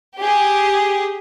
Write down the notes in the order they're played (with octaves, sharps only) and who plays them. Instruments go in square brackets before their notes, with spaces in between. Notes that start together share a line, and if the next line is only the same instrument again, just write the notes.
[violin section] G4 G#4